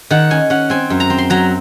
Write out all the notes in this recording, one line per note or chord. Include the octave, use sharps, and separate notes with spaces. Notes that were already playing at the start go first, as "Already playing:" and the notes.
D#3 F#5
C#4 G#5
C#4 F#5
C4 G#5
F#2
A#5
C4
C6
F#3 A#5